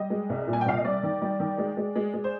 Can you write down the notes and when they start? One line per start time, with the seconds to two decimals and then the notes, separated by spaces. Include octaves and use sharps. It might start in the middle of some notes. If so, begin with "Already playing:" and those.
Already playing: G3 D#5
0.10 G#3
0.30 C2
0.47 A#2
0.53 G#5
0.61 G5
0.66 C2 F5
0.77 D#5
0.84 G3 D5
1.03 D#3
1.22 G3
1.40 D#3
1.58 G#3
1.77 G#3
1.96 G#3
2.14 G#3
2.24 C5